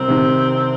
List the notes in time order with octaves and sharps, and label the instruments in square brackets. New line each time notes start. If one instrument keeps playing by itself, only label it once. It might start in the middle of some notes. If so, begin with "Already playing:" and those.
Already playing: [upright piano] C2 [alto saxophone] C4
[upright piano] C3 D#3